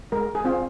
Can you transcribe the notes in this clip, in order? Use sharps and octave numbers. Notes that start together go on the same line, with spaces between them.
G#3 A#4
G#4
C4 F4